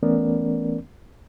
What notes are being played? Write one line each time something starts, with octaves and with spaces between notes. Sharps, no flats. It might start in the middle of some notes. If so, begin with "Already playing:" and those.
E3 A3 B3 C#4 A#4 D5